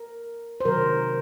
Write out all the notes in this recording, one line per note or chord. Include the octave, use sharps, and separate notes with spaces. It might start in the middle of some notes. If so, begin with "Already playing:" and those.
Already playing: A#4
C5
C3 D#3 F#3 A#4